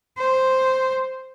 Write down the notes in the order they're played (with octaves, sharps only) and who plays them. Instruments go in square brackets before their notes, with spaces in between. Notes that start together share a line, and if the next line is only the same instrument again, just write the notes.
[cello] C5